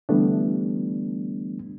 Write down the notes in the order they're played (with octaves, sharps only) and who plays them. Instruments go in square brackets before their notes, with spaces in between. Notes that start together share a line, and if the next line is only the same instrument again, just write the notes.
[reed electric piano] D3 E3 G3 A3 B3 D4